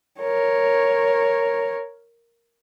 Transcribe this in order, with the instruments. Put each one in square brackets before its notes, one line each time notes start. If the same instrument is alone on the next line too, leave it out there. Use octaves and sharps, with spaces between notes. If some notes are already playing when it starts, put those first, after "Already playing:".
[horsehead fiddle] A#4 C#5